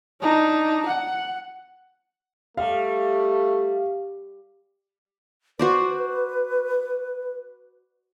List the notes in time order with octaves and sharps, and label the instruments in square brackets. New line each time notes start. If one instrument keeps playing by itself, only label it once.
[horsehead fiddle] D4 D#4
F#5
[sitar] G3 [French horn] A3 [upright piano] F5
[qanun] F#4 C5 D5 [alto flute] B4